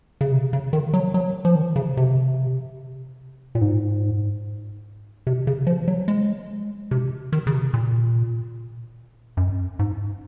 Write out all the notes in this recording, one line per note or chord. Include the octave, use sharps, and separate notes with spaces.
C#3
C3
C#3
D#3
F#3
F#3
F3
D#3
C#3
C3
A#2
G#2
C3
C#3
F3
F#3
G#3
C3
D#3
C#3
C3
A#2
F#2
G#2